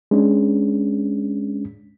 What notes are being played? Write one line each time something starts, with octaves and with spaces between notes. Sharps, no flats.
G#3 C#4 D4